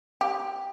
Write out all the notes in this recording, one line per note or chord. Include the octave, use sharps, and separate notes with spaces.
G4